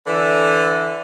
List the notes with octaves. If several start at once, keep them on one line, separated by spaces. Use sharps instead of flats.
D3 E3